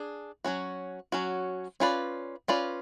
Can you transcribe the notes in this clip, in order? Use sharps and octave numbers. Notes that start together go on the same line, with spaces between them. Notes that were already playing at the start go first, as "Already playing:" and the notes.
Already playing: D4 G#4
F#3 C#4 F#4
F#3 C#4 F#4
C#4 F4 B4 D5
C#4 F4 B4 D5